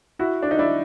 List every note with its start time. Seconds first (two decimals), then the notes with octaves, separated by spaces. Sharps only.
0.19 E4 F#4
0.43 D4
0.51 D#4
0.59 D4 E4